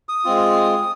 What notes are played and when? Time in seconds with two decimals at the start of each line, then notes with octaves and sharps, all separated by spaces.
0.09 D#6
0.24 G#3 C4 F4